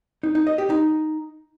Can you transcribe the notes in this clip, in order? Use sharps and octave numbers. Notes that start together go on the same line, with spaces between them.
D#4
D#4
D#5
G4
D#4